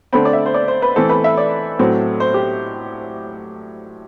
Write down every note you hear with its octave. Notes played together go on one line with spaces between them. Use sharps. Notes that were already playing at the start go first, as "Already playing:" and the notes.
D3 A3 C4 B5
D5
E5
C5
D5
C5
B4
E3 A3 C4 A4
B4
E5
D5
A2 F#3 A3 C4
C5
G4